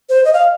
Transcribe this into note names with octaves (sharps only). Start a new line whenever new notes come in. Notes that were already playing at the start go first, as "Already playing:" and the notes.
C5
D#5
F5